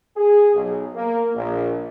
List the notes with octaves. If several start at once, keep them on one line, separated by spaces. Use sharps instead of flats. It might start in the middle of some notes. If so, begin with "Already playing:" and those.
G#4
B1
A#3
A#1